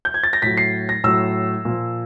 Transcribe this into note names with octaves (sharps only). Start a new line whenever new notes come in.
G6
G#6
A6
A#6
A2 F#3 B6
C7
A#6
A2 F#3 E6
A#2 F3